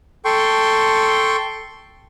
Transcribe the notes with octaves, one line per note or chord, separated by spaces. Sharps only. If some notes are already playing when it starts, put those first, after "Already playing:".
A4 G5 C6 C#6